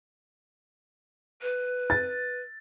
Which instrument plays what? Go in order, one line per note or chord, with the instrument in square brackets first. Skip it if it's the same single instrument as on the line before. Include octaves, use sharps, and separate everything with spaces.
[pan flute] B4
[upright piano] A6